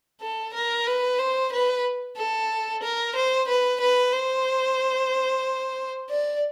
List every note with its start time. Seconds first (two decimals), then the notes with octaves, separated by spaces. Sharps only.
0.21 A4
0.54 A#4
0.87 B4
1.19 C5
1.52 B4
2.17 A4
2.83 A#4
3.16 C5
3.48 B4
3.81 B4
4.13 C5
6.09 D5